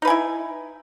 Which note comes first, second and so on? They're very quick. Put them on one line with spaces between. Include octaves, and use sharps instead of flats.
D#4 B4 G#5 E4